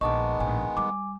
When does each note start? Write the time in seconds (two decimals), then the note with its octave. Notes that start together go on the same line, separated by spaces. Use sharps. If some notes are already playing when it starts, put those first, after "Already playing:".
0.01 A#1 D#3 G#3 B3 D#5 A5 C#6 D6
0.40 A#1 A2 G#5
0.77 G3 D6